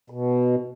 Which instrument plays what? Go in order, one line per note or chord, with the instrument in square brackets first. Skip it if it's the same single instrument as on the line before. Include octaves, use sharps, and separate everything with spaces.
[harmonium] B2